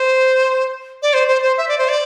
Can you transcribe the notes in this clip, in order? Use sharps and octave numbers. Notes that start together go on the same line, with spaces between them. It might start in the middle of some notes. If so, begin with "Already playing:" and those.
Already playing: C5
D5
C5
C5
C5
E5
D5
C5
D5